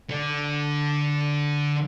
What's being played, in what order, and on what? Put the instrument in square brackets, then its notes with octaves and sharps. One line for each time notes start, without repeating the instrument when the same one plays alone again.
[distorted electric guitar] D3 D4